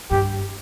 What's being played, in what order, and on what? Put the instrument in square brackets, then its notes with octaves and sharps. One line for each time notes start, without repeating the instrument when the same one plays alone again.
[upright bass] G2 [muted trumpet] G4